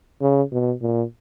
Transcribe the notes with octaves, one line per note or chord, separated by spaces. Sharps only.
C#3
B2
A#2